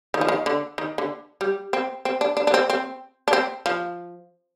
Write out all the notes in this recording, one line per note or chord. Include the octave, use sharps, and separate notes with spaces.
D#3
F3
D#3
D3
D#3
D3
G3
C4
C4
D4
D4
D4
C4
C4
D4
C4
F3